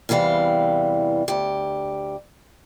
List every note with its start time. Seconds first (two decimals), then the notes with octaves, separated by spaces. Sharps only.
0.09 E2 C3 E3 G3 F5
1.28 D2 G4